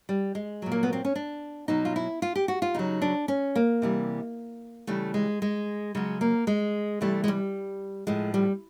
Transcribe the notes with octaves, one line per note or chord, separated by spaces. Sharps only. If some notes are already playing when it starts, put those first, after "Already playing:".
G3
G#3
A#2 F#3
A#3
B3
C4
C#4
D4
B2 F#3 D#4
F4
E4
F4
G4
F#4
F4
C#3 F#3 D#4
D4
C#4
A#3
C3 E3 G3
C#3 E3 G3 A3
G#3
G#3
C#3 F#3 G#3
A#3
G#3
C3 E3 G3 A3
G#3
G3
A2 F3 G#3
G3